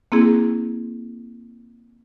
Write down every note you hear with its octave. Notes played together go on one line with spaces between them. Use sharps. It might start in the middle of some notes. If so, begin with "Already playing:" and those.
A#3 C4 E4 G#4